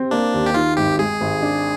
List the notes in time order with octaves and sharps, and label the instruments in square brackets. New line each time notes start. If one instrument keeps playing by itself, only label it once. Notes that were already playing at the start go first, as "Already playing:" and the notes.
Already playing: [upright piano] C4
[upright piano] A#3 [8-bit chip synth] D4
[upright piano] D#2
[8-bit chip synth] G4
[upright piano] D#3 [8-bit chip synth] F4
[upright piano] G#1 [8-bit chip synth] G4
[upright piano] G#3 [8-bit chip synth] G#4
[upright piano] G#1
D4